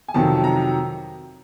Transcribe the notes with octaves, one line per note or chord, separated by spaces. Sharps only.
G#5
F2 C3 D#3 F#3 A5
A#5